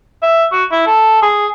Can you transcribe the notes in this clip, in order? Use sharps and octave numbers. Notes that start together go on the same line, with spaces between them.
E5
F#4
E4
A4
G#4